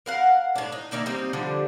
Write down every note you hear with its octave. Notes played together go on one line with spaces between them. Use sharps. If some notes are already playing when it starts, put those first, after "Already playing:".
A#4 F5 F#5
A2 D4
D#4
D#3 A#3 D5 E5
G3 A#3 C4 D#4
D3 F3 G3 D4